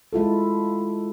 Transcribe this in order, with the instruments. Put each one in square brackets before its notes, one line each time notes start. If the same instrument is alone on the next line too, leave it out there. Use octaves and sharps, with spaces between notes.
[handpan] G#3 E4 F4 A4